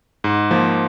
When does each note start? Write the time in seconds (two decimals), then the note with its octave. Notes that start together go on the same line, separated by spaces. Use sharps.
0.24 G#2
0.51 F3 A#3